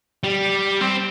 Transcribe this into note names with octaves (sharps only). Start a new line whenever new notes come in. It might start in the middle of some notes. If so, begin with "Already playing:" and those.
G3
C4